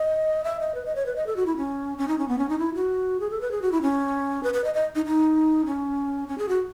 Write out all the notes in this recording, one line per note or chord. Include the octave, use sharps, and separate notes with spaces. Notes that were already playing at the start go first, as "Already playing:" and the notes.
Already playing: D#5
E5
D#5
B4
D#5
C#5
B4
D#5
A4
F#4
E4
C#4
C#4
D#4
C#4
B3
C#4
D#4
E4
F#4
G#4
A4
B4
G#4
F#4
E4
C#4
B4
B4
D#5
D#5
D#4
D#4
C#4
C#4
G#4
F#4